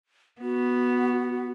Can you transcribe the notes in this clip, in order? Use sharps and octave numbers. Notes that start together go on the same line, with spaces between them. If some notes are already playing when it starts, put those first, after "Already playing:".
B3 F#4